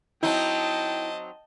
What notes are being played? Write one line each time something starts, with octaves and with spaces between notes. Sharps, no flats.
F#3 C4 D#4 E4 D#5 G5 A5